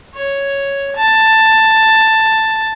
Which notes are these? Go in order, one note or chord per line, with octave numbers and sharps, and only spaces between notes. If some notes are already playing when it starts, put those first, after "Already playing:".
C#5
A5